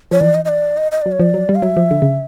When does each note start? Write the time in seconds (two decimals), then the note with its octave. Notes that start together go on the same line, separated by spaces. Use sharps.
0.11 F3 C#5
0.20 E3 D5
0.35 D#5
0.45 D#5
0.49 D5
0.77 D#5
0.92 D#5
1.02 F#3 D5
1.12 C#5
1.20 F3 D5
1.34 F#3
1.49 G3
1.55 F5
1.62 F#3 E5
1.77 F3
1.91 D3
2.02 C#3